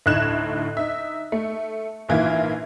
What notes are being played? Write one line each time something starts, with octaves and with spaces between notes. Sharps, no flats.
D2 A2 D#4 F#6 G#6 E7
D#4 E5
A3
A#1 G#2 E3 A#3 F4 G#6